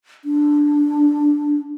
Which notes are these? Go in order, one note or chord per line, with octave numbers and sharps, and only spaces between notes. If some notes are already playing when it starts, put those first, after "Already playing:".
D4